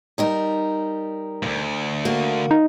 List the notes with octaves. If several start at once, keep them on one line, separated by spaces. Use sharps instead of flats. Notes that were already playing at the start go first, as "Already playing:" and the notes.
G3 D#4 A#4
D2 G#2
A#3 F#4
D#4